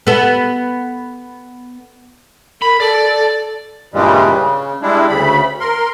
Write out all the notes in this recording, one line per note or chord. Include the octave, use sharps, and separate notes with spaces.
B3 A4
A#4 B5
A4 D5
G2 A#2 C#3 E3 G3 G#3
C#3
G3 G#3 D4 E4
D2 C#3 B5
A#4 C6